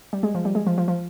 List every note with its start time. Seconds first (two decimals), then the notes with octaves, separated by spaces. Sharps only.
0.13 G3
0.23 G#3
0.35 F3
0.45 G3
0.55 G#3
0.67 F3
0.78 F3
0.88 F3